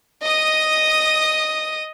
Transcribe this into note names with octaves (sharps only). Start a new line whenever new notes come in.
D#5 D#6